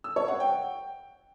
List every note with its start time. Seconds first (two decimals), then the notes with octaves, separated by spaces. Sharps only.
0.04 E6
0.16 C#5
0.28 F#5
0.40 G5